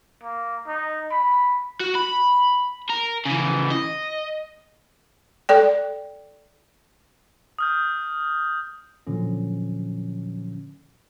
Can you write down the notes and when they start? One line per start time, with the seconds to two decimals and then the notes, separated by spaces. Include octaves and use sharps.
0.24 A#3
0.67 D#4
1.11 B5
1.80 F#4
1.95 B5
2.90 A#4
3.25 C#3 E3
3.71 D#5
5.49 A4 D5 G5
7.59 D#6 F6 G6
9.07 A#2 D3 F3 F#3 C#4